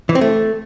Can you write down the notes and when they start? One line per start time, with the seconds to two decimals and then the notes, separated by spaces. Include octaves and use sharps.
0.09 E3
0.15 C4
0.21 A3